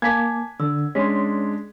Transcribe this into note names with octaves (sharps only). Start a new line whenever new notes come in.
A#3 G#5 A5 D6 G#6 B6
D3 E6
G#3 C#4 D4 C6 B6